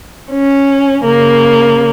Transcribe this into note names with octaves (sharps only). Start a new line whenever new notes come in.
C#4
C#3 A#3